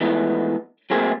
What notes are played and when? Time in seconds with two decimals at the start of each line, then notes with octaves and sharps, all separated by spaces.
0.01 E3 F3 G#3 A3 B3 D#4
0.90 F#3 A3 A#3 C4 G#4 C5